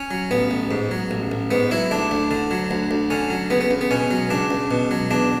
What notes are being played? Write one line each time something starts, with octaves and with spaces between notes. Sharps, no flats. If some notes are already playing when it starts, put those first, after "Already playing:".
Already playing: C#4
F#3
A1 B3
A1
G#2
F#3
A1
A1
G#2 B3
F#3 E4
D2 D4
D2
D3
F#3
D2
D2
D3 C#4
F#3
C#2 B3
B3
C#2
B3
B2 C#4
F#3
C#2 D4
C#2
B2
F#3
E2 D4